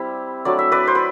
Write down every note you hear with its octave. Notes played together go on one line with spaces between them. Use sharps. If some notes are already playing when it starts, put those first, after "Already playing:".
Already playing: G3 C4 E4
F#3 A3 D4 D5
E5
B4 D5
C5
B4